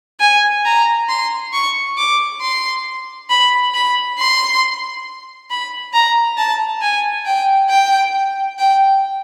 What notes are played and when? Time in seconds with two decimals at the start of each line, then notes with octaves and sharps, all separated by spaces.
0.20 G#5
0.65 A#5
1.08 C6
1.53 C#6
1.98 D6
2.41 C6
3.30 B5
3.74 B5
4.18 C6
5.50 B5
5.93 A#5
6.38 A5
6.82 G#5
7.25 G5
7.70 G5
8.59 G5